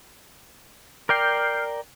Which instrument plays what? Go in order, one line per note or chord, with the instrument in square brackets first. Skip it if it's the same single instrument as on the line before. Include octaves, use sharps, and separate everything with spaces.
[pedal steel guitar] A#4 D5 G5 [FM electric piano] F6 G6 C7